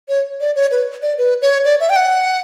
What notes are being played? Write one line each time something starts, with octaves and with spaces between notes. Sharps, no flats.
C#5
D5
C#5
B4
D5
B4
C#5
D5
E5
G5
F#5